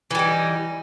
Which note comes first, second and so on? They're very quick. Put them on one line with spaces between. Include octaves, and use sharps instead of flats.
E3 G3 D#4